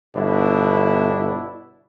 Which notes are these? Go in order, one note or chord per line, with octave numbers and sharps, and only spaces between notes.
G1 B2 D4 E4